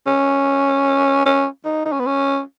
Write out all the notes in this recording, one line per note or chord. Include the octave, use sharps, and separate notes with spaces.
C#4
C#4
D#4
D#4
C#4
B3
C#4